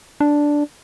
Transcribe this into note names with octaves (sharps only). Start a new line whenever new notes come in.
D4